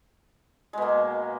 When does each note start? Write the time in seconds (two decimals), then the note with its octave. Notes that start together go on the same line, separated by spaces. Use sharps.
0.73 G#3
0.78 B2
0.82 A#3